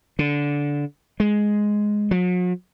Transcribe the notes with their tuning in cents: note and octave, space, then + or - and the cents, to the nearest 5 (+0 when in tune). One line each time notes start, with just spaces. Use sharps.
D3 -15
G#3 +5
F#3 -45